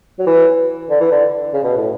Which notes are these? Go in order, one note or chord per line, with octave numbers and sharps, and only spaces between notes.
F#3
E3
D3
E3
D3
C#3
B2
A2